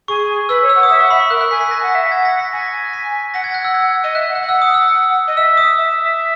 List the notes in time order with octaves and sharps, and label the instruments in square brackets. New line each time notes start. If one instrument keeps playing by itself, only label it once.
[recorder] G#4 [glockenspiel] C#6
[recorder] B4 [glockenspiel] E6
[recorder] C#5
[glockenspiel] E6
[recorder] F#5
[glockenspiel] D#6
[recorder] E5 [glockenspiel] E6
[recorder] F#5 [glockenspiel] C#6
[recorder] E5 [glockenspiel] B5
[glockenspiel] C#6
[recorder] A#4 [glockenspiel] F#6
[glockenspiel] F#6
[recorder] G#5 [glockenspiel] B6
[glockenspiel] B6
[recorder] G#5 [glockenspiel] A#6
[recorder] F#5
E5
[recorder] F#5 [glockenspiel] G#6
[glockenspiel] A#6
B6
[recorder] G#5 [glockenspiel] A#6
[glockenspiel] B6
[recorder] F#5 [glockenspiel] A#6
[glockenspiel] G#6
F#6
E6
G#6
[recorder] D#5
[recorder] E5 [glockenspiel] F#6
[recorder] F#5
[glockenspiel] F#6
[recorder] F#5
[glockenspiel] E6
D#6
E6
[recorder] D#5
[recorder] E5 [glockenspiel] E6
[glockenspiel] D#6
[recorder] E5